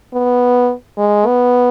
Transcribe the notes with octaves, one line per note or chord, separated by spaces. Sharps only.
B3
G#3
B3